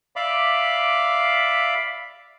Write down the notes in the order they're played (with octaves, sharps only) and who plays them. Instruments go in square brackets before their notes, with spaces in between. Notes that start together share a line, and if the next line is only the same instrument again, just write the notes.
[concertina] D5 E5 F5 B5 D6